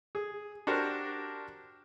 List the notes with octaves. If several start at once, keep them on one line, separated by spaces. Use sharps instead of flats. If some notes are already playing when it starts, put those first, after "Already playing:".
G#4
D4 F#4 G4 A#4 C5